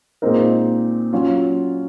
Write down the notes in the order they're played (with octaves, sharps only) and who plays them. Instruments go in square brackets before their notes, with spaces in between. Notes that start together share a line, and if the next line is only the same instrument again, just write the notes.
[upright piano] A#2 G#3 C4 D#4 A#4
F#3 C#4 F4